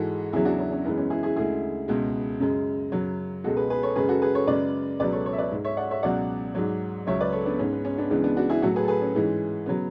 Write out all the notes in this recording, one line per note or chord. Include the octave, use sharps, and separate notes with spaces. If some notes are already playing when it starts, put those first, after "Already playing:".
Already playing: G#2 E3 G#3 F#4 A4
E2 C#3 F#3 E4 G#4
D4 F#4
C#4 E4
C#4
F#2 E3 G#3 B3
C#4
E4 G#4
E4 G#4
D2 C#3 G#3 E4 G#4
C#2 B2 G#3
F#2 C#3 G#3
F#2 C#3 F#3
C#2 B2 G#3 F#4 A4
G#4 B4
G#4 B4
A4 C#5
F#2 C#3 G#3 G#4 B4
F#4 A4
G#4 B4
A4 C#5
F#2 C#3 G#3 B4 D5
C#2 B2 F#3 B4 D5
A4 C#5
A4 C#5
E5
B4 D5
G#2 G#3
C#5 E5
D5 F#5
C#5 E5
C#2 B2 F#3 D5 F#5
G#2 F#3
C#2 C#3 F#3 C#5 E5
B4 D5
A4 C#5
B3 D4
G#2 G#3 C#4
B3
C#4
B3 D4
C#2 C#3 E3 G#3 B3 D4
B3 D4
D4 F#4
E4 G#4
A2 F#3 F#4 A4
G#4 B4
A4
G#4 B4
C#4
G#2 E3 G#3
C#3 F#3 B3